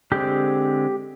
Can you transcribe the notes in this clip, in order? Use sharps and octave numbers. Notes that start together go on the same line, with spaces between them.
D3 G#3 C4 G4